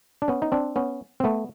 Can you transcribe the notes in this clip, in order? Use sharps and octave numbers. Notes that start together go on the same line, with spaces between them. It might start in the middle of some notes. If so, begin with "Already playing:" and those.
D4
B3 C#4
D#4
C4 D4
B3 C#4
C4
A3 B3